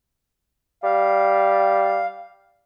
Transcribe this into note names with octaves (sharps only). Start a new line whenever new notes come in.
G3 F5